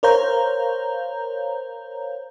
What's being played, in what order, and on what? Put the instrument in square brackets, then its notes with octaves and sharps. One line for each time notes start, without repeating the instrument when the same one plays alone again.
[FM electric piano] A#4 C5 C#5 F5 A#5 G6